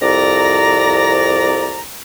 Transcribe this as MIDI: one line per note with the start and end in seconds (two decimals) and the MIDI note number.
0.02 1.82 36
0.02 1.82 41
0.02 1.82 74
0.02 1.82 82